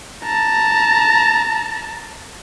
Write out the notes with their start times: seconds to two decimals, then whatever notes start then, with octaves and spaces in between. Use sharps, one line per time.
0.24 A5 A#5